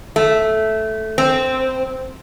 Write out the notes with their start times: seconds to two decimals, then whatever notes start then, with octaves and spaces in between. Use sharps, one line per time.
0.16 A3
1.18 C4